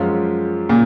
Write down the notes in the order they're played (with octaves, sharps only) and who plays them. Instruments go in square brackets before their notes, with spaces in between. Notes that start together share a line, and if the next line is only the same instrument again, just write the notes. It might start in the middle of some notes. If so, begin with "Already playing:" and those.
Already playing: [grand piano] F#2 F3 G#3 C#4 F4
[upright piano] A#2 [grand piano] C#3